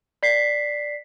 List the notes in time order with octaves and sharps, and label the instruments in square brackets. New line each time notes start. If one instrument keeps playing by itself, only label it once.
[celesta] D5 B6 C7